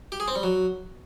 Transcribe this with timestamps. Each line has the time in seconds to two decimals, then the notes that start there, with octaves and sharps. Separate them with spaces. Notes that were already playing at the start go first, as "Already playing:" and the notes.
0.12 G4
0.20 G#4
0.28 C4
0.36 G3
0.43 F#3